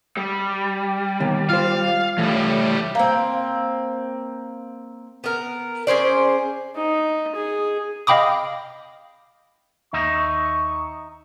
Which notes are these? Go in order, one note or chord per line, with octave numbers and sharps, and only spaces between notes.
G3
D#2 B2 D#3
F4 C5 F5
A2 E3 G3
A#3 C4
B3 A#4
C#4 G#4 C5 D5
D#4
G#4
D#5 F5 G5 B5 D6 D#6
D#2 D#4 E5 C#6 D#6